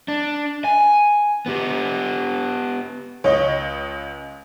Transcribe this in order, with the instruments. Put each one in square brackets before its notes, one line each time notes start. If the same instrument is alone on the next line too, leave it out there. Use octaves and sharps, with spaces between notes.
[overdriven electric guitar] D4
G#5
B3 G4
[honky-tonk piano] C#2 D#5 [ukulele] C#5